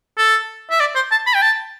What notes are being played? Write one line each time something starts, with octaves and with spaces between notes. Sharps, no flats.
A4
E5
D5
C5
A5
B5
G5
A5